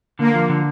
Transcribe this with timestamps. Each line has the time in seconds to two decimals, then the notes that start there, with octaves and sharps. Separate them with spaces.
0.19 D3 A#3
0.34 F3
0.49 D3